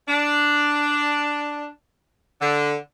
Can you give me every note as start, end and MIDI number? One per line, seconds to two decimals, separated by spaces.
0.08 1.67 62
2.41 2.74 50